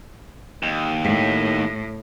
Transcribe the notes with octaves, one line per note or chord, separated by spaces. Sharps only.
D#2
A2